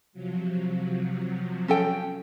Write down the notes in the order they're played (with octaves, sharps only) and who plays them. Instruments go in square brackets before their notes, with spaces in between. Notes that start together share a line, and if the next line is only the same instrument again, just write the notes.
[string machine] C3 F3 F#3
[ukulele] C#4 A4 G5